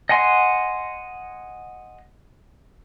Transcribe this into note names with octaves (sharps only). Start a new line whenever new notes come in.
D#5 F#5 G#5 C6